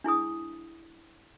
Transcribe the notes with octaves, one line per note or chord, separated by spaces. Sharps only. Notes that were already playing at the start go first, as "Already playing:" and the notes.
D4 E4 G#4 D#6